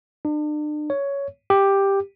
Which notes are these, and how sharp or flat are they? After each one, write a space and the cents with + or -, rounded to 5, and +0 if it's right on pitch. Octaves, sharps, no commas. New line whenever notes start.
D4 +40
C#5 +10
G4 +5